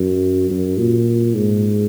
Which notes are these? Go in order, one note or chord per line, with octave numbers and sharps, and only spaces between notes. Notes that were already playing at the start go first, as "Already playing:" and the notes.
Already playing: F#2
F#2
A#2
G#2